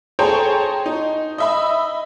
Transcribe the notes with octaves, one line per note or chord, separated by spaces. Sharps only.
G#4 A4 C5 C#5 G5 A#5
D#4
D#5 E5 B5